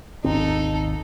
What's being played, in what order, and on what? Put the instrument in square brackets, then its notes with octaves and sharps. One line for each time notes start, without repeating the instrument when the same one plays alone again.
[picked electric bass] G#1 D#2 C4 [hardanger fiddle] D#4 A4